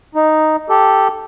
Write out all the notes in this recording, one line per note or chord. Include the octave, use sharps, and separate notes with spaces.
D#4
G4 A4